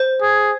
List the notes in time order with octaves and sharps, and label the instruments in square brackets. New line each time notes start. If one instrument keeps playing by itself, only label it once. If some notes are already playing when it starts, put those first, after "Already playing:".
Already playing: [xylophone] C5
[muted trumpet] G#4